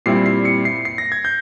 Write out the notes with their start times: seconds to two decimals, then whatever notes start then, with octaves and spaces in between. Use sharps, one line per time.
0.06 A#2 G3 C4 E4 C7
0.26 C7
0.45 C#7
0.65 C7
0.85 C7
0.98 A#6
1.12 G#6
1.25 G6